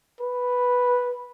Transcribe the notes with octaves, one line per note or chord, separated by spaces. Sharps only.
B4